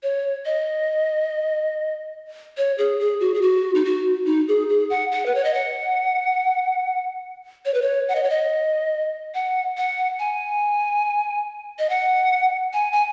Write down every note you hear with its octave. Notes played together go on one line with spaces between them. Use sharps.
C#5
D#5
C#5
G#4
G#4
F#4
G#4
F#4
D#4
F#4
D#4
G#4
G#4
F#5
F#5
B4
C#5
D#5
F#5
C#5
B4
C#5
F#5
D#5
C#5
D#5
F#5
F#5
G#5
D#5
F#5
G#5
G#5